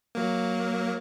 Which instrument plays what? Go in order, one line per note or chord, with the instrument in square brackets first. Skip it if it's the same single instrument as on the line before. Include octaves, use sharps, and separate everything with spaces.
[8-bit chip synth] F#3 A#3